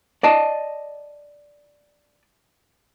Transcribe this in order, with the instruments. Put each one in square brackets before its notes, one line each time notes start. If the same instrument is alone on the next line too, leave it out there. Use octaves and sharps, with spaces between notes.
[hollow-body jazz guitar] D5 D#5 A5